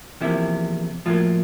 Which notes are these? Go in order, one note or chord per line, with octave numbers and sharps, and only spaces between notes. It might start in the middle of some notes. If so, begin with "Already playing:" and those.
E2 C3 F3 A#3 E4
A2 F3 F#3 A#3 F4